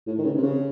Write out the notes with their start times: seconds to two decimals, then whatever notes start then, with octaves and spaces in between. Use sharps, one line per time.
0.07 A2
0.18 D#3
0.25 C#3
0.38 C3
0.43 C#3